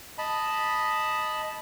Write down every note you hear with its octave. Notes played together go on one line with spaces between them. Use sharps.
D#5 A5 B5